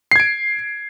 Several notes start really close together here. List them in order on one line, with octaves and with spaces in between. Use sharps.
C7 G#6 D7